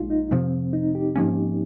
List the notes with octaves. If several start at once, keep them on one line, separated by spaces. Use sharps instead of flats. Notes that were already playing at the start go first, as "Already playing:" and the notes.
Already playing: A#1 A#2 G#3 D#4 F4
D#4
F2 C3 F3 C4
D#4
G4
G#2 F3 A#3 C#4